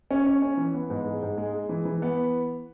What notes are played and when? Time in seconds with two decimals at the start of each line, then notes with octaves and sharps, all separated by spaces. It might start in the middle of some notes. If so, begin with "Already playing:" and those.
0.11 C#4
0.26 C#4
0.42 C#4
0.57 E3
0.74 B3
0.90 G#2
1.05 G#3
1.22 G#2
1.38 G#3
1.53 G#3
1.69 E3
1.85 E3
2.02 B3